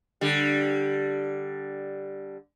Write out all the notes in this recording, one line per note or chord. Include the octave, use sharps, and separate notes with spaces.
D3 G3